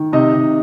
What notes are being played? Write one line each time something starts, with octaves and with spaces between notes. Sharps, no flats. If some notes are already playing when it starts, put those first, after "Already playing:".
Already playing: D#3
C3 D#4 D#5
C3